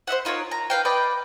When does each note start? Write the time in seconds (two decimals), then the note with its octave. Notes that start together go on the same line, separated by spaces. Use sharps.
0.07 C5 D#5 E5 F#5
0.25 D#4 F4 A#4 C#5
0.51 A#5
0.70 B4 F5 G5
0.85 B4 D5 D#5 G5